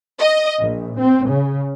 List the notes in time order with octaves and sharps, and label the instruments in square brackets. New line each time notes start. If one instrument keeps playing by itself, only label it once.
[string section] D#5
A#1
C4
C#3